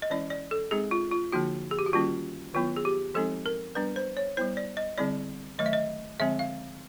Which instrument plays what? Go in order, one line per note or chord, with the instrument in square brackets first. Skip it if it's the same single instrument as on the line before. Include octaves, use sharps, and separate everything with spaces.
[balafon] D#5
E3 G#3 C#4 E4 D5
D5
A4
G#3 C4 D#4 G#4
F4
F4
D3 F3 A#3 D#4 F#4
G#4
G4
F#4
D#3 G3 A#3 C#4 F4
D#3 F#3 B3 E4 F4
G#4
G4
F3 G#3 C4 D#4 A4
A#4
G3 B3 D4 B4
C5
C#5
G3 B3 E4 C5
D5
D#5
D3 G3 C4 E4 D5
D#3 F#3 A3 D#5
E5
D#5
D3 F3 G#3 C4 E5
F5